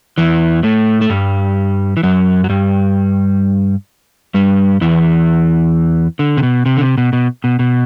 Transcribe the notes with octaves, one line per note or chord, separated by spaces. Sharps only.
E2 E3
A2 A3
A3
G2 G3
E3
F#2 F#3
F#3
G2 G3
G2 G3
E2 E3
D3
C3
B2
C3
D3
C3
B2
B2
B2
B2